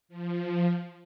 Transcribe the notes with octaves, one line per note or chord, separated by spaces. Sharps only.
F3